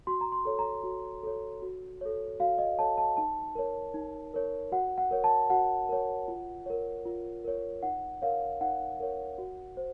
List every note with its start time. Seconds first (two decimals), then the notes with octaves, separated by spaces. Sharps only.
0.07 F#4 C6
0.21 A#5
0.32 C6
0.45 A4 C#5
0.59 A#5
0.84 F#4
1.23 A4 C#5
1.62 F#4
2.01 A4 C#5
2.40 F#4 F5
2.58 D#5
2.79 A4 C#5 A5
2.98 A5
3.17 D#4 A5
3.55 A#4 C#5
3.94 D#4
4.34 A#4 C#5
4.72 F#4 F#5
4.98 F#5
5.11 A#4 C#5
5.24 A5
5.50 F#4 F#5
5.89 A#4 C#5
6.28 F4
6.66 A#4 C#5
7.05 F4
7.44 A#4 C#5
7.83 D#4 F#5
8.22 A#4 C#5 F5
8.61 D#4 F#5
9.00 A#4 C#5
9.38 F#4
9.77 C5